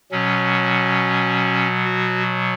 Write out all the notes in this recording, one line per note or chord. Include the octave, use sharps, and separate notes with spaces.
B2 F#3 C#4
F#4